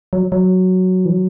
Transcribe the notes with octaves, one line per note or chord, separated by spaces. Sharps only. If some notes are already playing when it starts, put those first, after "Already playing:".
F#3
F#3
E3
F#3